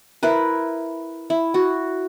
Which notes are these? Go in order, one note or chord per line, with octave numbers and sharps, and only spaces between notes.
E4 A#4 B4
E4
F#4